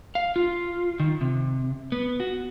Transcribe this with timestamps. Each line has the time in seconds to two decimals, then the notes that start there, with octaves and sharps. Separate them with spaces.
0.15 F5
0.36 F4
1.00 D#3
1.21 C3
1.92 B3
2.20 F#4